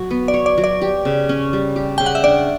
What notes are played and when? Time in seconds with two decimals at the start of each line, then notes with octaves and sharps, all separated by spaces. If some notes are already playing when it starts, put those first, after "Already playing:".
Already playing: F#3 F#4
0.11 B3
0.28 D5
0.34 C#5
0.46 D5
0.58 F#3
0.64 D5
0.82 G4
1.05 C#3
1.29 C#4
1.53 G3
1.76 G4
1.98 C#3 G5
2.06 F#5
2.15 E5
2.24 D4 D5